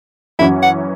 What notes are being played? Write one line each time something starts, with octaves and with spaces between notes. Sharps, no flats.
F#2 E3 C#4 E4 F#4
F#5